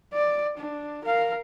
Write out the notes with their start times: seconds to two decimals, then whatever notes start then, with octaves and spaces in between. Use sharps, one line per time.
0.13 D5
0.57 D4
1.04 A#4 F5